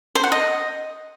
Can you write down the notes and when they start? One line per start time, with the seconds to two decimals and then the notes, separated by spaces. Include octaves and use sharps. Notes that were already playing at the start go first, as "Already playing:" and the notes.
0.15 C5
0.24 F#5
0.32 D#5